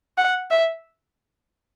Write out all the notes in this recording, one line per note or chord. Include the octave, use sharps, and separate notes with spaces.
F#5
E5